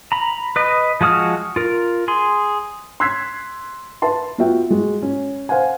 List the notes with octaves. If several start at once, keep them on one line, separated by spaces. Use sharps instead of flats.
A#5 B5
B4 D#5
F3 G#3 F#4 D#6 F6
F4 A#4
G#4 C6
C6 E6 F#6 G#6 B6 C7
B4 E5 A5 C6
B3 F4 F#4 E5 G5
G#3 F#4
C#4
C5 F5 F#5 G#5